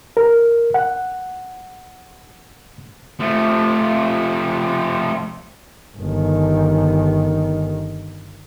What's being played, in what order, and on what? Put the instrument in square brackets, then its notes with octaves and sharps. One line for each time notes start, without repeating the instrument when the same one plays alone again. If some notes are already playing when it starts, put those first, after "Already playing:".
[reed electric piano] A#4
F#5
[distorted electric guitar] F3 A3
[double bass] G1 D#3